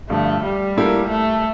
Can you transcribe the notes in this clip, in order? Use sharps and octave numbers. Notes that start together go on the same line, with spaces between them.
G2 D3 F3 A3
G3
A#2 A3 E4 G4 A#4
A3